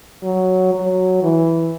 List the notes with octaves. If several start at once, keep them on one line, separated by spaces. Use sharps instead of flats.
F#3
F#3
E3